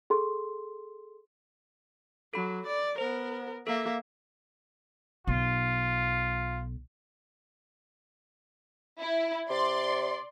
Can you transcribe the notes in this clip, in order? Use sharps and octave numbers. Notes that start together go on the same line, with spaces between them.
G#4 A4 C6
F#3 A4 B5
D5
B3 A#4 C5
A#3 A4 E5 F5
B1 F4
E4
C3 D5 C6